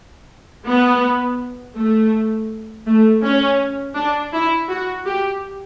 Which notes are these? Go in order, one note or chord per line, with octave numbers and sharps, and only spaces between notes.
B3
A3
A3
C#4
D4
E4
F#4
G4